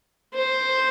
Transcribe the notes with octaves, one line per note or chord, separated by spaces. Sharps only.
C5